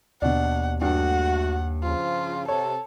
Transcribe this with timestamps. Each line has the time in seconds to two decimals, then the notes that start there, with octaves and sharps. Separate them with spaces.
0.22 D#2 B2 D4 F#5
0.81 G2 A3 F#4 F#5
1.83 C#3 F3 F4
2.48 C3 A4 C#5